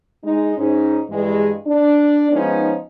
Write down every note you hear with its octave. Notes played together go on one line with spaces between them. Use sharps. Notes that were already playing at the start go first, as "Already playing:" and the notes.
G#3 D#4
G#2 C#4 D#4
G2 E3 G#3
D4
F3 G#3 B3 C#4 D#4